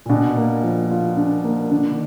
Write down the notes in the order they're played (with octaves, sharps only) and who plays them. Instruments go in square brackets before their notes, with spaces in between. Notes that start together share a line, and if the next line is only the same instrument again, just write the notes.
[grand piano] A#2
[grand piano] B2 [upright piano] D4
[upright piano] A#3
F3
F4
D4
A#3
[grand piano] D3 [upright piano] D4
[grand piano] D#3